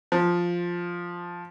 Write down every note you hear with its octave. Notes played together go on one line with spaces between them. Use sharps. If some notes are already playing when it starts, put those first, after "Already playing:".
F3